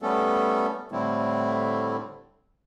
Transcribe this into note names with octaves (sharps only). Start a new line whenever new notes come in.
G3 A3 B3 C#4 A4
A2 D3 G3 A3 C4 E4